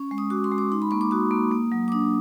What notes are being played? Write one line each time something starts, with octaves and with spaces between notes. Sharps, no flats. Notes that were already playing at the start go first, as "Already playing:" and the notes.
Already playing: C#4 C#6
G#3
D#6
F#4 D6
C6
G#3
D6
D#4 C6
B5
A#3 C#6
D6
F#4 D#6
A#3
A#3
F#3
D6
D4 D#6